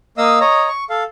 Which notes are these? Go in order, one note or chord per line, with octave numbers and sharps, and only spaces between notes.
A#3 D#5 F5 D#6 E6
C#5 D#5 A#5
C#6
A4 F5